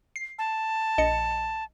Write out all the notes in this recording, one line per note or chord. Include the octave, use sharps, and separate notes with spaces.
C7
A5
A#1 D#5 C#7